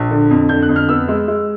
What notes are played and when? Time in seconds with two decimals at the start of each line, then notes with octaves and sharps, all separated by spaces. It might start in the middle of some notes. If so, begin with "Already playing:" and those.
Already playing: A#1
0.11 D3
0.30 F2
0.49 D3 G6
0.62 F#6
0.69 F2
0.76 F6
0.89 B3 E6
1.08 G#3
1.28 G#3